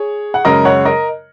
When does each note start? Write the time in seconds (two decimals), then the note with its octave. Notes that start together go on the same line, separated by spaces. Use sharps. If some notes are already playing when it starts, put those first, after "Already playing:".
Already playing: G#4 C#5
0.34 F#5
0.45 F#2 C#3 G#3 A#4 D#5
0.65 C#5 F#5
0.85 A#4 D#5